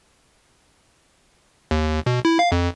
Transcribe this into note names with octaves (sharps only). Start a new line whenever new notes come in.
D#2
B2
E4
F5
F2